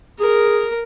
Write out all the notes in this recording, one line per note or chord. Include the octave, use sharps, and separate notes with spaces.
G#4 A#4